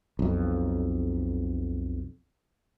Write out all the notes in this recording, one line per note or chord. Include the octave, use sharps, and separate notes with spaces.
B1 F2